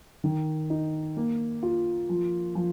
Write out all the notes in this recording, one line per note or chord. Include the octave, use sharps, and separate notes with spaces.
D#3
D#4
A#3
F4
F3
F3